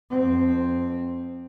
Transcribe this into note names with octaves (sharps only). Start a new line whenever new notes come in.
F2 C4